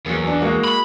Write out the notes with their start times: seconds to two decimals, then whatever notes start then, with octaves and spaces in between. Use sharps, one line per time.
0.06 E2 F#3 A#3
0.27 D4
0.41 G#3 A#3 F#4
0.64 B5